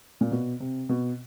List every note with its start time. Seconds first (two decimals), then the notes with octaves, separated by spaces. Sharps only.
0.21 A#2
0.31 B2
0.60 C3
0.89 B2